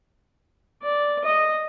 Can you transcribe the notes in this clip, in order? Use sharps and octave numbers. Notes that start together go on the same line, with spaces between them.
D5
D#5